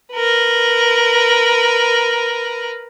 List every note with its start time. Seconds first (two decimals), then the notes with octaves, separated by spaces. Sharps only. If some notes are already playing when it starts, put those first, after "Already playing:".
0.13 A#4 B4